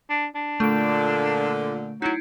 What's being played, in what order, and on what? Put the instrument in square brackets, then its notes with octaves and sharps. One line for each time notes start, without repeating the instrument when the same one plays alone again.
[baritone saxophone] D4
D4
[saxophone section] A#2 D3 [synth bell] A3 D7
[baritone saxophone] F#3 [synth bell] D#4 E4